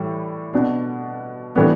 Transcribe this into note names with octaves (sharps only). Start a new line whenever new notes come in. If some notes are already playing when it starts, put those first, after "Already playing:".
Already playing: A2 E3 G3
B2 B3 D4
A2 E3 G3 B3 D4